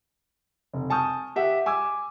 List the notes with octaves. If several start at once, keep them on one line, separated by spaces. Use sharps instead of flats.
F1
G#5 A5 C#6 D#6 F6 G6
G4 E5 F#5
G#5 D6 E6 G#6